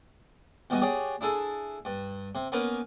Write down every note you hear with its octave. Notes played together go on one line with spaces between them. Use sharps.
E2 G3 F#4 D#5 G#5
G4 G#4 C#5 D5 F#5 G5
D4 E4 G#4 A4
G2
C3
A#3 B3 C#4 A#4 B4